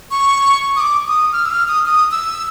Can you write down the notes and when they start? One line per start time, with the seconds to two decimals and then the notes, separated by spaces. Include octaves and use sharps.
0.11 C#6
0.76 D#6
0.80 D6
1.07 D#6
1.33 F6
1.45 E6
1.51 F6
1.68 D#6
1.86 D#6
2.12 E6